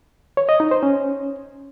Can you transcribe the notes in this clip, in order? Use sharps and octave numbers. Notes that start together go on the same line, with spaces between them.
C#5
D#5
D#4
C5
C#4